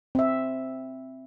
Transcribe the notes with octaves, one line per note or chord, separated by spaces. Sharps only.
C4 E5